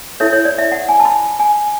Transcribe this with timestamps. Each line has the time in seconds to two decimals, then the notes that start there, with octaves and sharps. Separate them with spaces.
0.20 E4 A4 C#5 E5
0.33 C#5
0.45 D5
0.58 E5
0.72 F#5
0.89 G#5
1.00 A5
1.05 B5
1.39 G#5